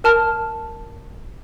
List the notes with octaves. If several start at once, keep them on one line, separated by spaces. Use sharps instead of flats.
A#4 A5 F6